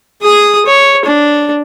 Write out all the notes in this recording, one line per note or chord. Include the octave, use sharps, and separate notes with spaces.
G#4 D#6
C#5
D4